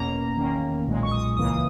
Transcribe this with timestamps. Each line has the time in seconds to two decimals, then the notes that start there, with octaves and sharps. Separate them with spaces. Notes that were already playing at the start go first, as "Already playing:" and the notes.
Already playing: E2 B2 A#3 C#4 A#5
0.36 E2 D#3 A#3 C#4
0.87 B1 A#2 G#3
1.03 C#6
1.11 D#6
1.37 C#2 C#3 E3 A#3 D#6